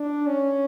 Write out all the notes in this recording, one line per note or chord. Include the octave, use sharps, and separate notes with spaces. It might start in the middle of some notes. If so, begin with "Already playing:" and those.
Already playing: D4
C#4